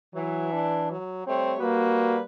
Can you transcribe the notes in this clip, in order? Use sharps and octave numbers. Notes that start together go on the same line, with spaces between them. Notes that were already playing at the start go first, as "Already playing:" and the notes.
E3 F#3
D4
F#3
G3 A3 C4 C#5
G3 A#3 F#4 B4